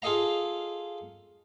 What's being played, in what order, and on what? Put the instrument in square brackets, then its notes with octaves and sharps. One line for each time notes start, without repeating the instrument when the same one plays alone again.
[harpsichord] F4 G#4 A4 D#5 F5 A#5